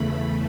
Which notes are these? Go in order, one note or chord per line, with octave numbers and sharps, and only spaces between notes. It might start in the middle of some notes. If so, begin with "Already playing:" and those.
Already playing: E2 C#3 E3 A3 B5